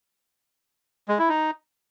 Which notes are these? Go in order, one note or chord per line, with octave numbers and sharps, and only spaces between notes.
G#3
E4
D#4